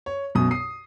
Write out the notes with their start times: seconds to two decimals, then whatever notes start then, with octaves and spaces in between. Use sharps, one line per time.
0.06 C#5
0.35 B1 F#2 B2 D#6
0.51 D#6 C7